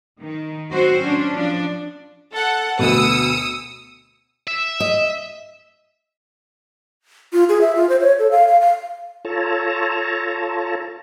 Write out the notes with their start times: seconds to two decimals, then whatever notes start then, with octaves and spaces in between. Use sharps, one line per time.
0.20 D#3
0.70 F#3 C4 F#4 C5
1.02 C#4 D4
1.34 F3 D4
2.33 A4 F#5
2.79 D2 B2 D#6 E6 C#7
4.48 E5
4.80 D#5
7.33 F4
7.49 G#4
7.61 E5
7.75 F4
7.89 C5
8.01 C#5
8.19 A4
8.31 F5
8.47 F5
8.61 F5
9.25 F4 A4 C#5 A5 A#5